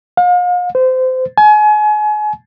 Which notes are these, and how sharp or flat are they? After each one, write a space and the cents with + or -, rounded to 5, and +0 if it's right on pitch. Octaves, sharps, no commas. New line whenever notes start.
F5 +40
C5 -25
G#5 +35